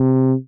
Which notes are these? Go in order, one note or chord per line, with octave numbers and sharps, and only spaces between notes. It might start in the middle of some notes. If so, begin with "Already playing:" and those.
Already playing: C3